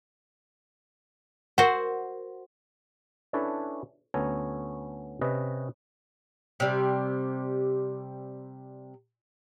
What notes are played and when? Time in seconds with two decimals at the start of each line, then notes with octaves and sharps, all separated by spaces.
1.58 F#4 A#4 C5 F#5
3.33 C#4 D4 E4 A4 B4 C#5
4.14 D2 B3 C#4 A4 C#5 A#5
5.21 C3 C#4 B4 D#5
6.60 C3 G3